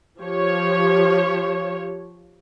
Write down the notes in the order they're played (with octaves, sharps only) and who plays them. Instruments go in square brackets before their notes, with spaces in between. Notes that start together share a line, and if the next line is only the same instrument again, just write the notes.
[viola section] F3 G4 C#5